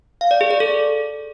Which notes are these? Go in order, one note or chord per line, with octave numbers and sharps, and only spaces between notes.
F5
D5
G#4
D5
A4